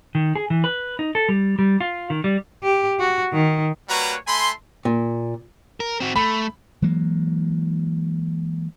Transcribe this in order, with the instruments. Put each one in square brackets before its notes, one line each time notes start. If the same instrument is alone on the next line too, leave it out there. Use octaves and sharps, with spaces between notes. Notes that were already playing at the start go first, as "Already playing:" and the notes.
[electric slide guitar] D#3
G#4
E3
B4
D#4
A4
G3
G3
F4
D#3
G3
[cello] G4
F#4
D#3
[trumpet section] G3 A#3 F#4 B4 C#5 A#5
A3 G#5 B5 C6
[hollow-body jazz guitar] A#2
[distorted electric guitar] A#4
C4 F#4
[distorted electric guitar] A3 [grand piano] B5
[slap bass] E3 F#3 G#3 A#3